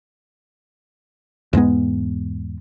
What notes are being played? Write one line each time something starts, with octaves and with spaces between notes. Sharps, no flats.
E2 G#2 G#3 B3